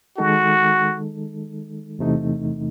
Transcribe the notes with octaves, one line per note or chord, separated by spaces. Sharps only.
D#3 G#3 D#4 F#4 A4
E2 C3 E3 A3 D#4